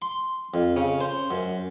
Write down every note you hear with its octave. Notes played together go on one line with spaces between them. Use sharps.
C6
F2
C#3
C5
F#2